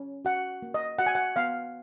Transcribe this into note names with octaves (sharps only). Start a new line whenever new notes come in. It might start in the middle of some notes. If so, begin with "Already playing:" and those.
Already playing: C#4
F#4 F#5
A#3
D#5
F#4 F#5
G#5
F#5
B3 F5